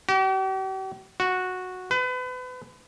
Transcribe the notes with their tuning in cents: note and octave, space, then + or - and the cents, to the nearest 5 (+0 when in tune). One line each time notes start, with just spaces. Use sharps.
G4 -45
F#4 -10
B4 +35